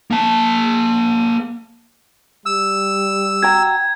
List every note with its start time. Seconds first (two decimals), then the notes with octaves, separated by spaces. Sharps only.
0.11 A#3 A5
2.46 G3 E6
3.43 F#4 G5 A#5 G#6